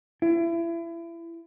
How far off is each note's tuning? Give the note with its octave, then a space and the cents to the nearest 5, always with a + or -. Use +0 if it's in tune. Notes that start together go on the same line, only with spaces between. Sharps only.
E4 +30